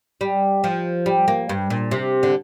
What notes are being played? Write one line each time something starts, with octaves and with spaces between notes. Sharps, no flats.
G3
F3
G3
A#3
G2
A#2
C3
D3